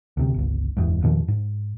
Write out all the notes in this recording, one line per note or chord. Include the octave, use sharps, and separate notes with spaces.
D2 C3
G1 C#2
F#1 E2 G#2
E2 A#2 D#3 F3
G#2